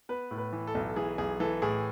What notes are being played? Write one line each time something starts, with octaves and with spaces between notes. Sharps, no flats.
B3 B4
A2
B4
E3
A4
B1
E3 G#4
B1 G#4
E3 A4
A2 G#4